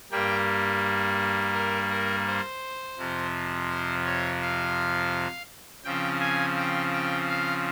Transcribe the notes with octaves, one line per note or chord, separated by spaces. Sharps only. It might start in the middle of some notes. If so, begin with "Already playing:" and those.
G2 G3 A#3 G5
A#4
A#4
C5
F2 C3 F3
C5
C#5
F5
C#3 F3 C4 G5
G#5
G5
G5
F5